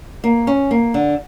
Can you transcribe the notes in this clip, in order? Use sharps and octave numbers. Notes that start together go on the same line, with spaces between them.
A#3
C#4
A#3
D3